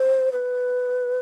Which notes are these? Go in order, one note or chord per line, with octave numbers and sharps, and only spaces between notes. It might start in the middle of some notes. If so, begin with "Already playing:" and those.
Already playing: C5
B4